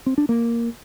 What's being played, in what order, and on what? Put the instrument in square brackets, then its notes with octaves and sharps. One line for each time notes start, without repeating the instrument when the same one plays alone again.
[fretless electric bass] C4
D4
A#3